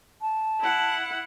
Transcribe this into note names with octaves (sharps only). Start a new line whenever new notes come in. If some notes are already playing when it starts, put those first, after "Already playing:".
A5
E4 F#5